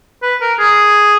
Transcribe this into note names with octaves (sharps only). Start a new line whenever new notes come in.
B4
A#4
G#4